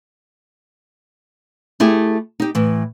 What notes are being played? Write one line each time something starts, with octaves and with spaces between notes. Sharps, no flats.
A3 E4 G4 G#4
D#4 G4
A2 E3